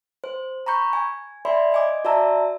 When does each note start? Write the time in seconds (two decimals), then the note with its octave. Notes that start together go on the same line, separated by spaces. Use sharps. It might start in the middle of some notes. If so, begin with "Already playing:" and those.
0.24 C5
0.66 A#5 B5 C#6 G6
0.93 G#5
1.45 D5 E5 G#5 B5 C6
1.72 D#5 G#5 D6
2.05 F#4 D5 E5 A5 A#5 E6